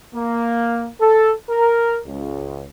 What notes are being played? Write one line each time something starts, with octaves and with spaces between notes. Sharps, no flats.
A#3
A4
A#4
C#2